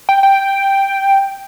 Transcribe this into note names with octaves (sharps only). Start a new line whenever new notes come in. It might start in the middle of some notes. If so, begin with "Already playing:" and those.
G5
G5